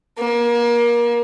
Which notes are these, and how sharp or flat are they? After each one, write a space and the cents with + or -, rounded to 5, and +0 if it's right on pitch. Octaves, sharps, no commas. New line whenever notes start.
A#3 +30